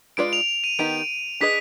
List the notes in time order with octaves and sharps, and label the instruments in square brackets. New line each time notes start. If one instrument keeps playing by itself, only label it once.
[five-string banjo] G#3 D4 F4 B4 D5 [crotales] D7
[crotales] F7
F7
D#7
[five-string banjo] D#3 B3 D#4 G4 [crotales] D7
[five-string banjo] D4 G#4 B4 D#5 [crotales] B6